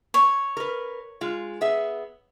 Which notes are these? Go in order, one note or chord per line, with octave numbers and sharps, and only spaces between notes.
C#5
A#4 B4
G#3 F4
B3 G#4 E5